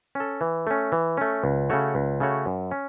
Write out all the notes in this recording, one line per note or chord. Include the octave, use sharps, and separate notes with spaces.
C#4 A4
E3
A3 C#4
E3
A3 C#4
C#2
C#3 A3 F#4 C#5
C#2
C#3 A3 F#4 C#5
F#2
C#4